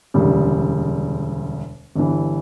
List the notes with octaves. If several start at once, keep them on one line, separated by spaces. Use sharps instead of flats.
E1 D2 C#3 G3
G1 G2 E3